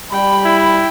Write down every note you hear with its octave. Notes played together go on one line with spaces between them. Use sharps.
G3 G5 B5
E4